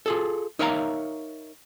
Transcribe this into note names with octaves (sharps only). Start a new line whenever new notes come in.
F4 G#4 A4
D#4 A#4 C#5 E5 F5 A#5